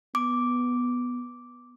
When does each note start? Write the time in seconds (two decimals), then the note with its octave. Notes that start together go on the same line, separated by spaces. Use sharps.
0.15 B3 D6